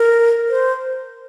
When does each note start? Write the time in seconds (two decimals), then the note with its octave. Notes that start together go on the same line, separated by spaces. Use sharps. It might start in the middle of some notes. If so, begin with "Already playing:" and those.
Already playing: A#4
0.49 C5